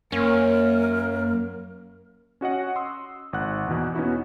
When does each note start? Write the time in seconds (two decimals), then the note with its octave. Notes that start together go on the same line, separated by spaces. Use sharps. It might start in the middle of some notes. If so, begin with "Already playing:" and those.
0.12 F#2 A#3 C#4 A#4
2.41 C#4 F#4 D#5 F#5
2.76 C6 D#6 E6
3.33 G#1 F#5 F#6
3.67 E2 B2
3.95 B3 C#4 D#4 E4 F#4